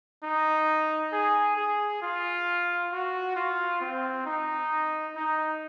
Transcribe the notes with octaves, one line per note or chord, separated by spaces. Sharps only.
D#4
G#4
G#4
F4
F#4
F4
C4
D#4
D#4